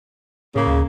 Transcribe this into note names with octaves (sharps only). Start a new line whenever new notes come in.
A2 C#3 A#3
D2